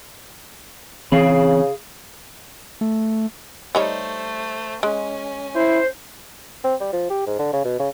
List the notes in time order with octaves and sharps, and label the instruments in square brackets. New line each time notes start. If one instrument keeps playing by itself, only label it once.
[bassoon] C#3 [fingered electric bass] E3 C4 [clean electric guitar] G#4 F5 B5
[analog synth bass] A3
[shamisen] G3 D#4 C#5 [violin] A3 C5
[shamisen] G#3 [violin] C#4 G#5
[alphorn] E4 [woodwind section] C5
[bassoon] C4
G3
F3
G4
G#2
D3
C#3
B2
C#3